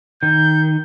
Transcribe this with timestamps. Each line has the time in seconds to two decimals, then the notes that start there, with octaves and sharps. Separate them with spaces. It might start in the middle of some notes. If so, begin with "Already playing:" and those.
0.23 D#3 G6